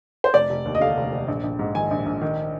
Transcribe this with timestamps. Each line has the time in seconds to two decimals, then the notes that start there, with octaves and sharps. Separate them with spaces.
0.24 C5
0.34 F1 D5
0.50 F1
0.65 D#2
0.75 D#5
0.81 D3 F5
0.97 F1
1.12 F1
1.28 A#1
1.44 A#1
1.59 G#2
1.75 D#3 G#5
1.91 A#1
2.06 A#1
2.21 D#3